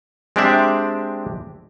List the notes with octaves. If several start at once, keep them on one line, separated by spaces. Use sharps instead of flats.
G#3 C4 D4 G4 D5 E5